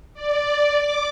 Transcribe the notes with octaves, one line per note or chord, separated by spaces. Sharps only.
D5
D6